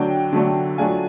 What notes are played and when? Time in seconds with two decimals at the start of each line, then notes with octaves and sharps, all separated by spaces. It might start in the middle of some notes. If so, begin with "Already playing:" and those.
Already playing: D3 F#3 A3 D4 G5
0.33 D3 F#3 A3 D4
0.78 F#3 A3 D4 F4 G#5